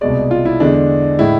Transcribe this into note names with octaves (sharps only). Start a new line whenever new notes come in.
C2 B2 G#3 D5
F4
E4
E2 D3 G#3 D4
A2 G#3 E4